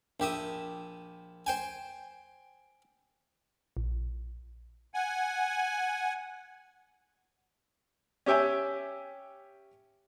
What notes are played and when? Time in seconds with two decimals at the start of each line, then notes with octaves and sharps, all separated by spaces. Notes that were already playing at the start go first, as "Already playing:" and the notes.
0.20 A#1 G4 E5 D#6
1.46 C5 G5 G#5
3.77 A#1
4.94 F#5 G#5
8.26 C#4 G4 E5 G5 G#5